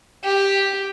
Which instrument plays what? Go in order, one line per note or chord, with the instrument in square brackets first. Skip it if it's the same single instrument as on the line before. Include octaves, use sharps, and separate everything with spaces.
[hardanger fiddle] G4